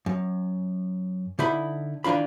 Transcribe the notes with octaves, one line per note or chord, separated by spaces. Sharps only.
F#2
D3 D#4 E4 B5
D#3 E3 D4 F4 B5